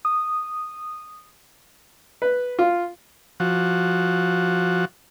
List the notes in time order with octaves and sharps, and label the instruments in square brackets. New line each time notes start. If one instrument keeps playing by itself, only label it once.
[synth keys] D#6
[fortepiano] B4
F4
[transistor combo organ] F3 F#4